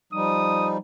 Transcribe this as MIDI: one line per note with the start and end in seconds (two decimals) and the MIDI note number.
0.13 0.77 53
0.13 0.77 55
0.13 0.77 63
0.13 0.67 87